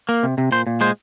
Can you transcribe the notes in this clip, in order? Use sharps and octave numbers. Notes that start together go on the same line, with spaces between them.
A#3
C3
C3
A#2 C5
A#2
G#3 C5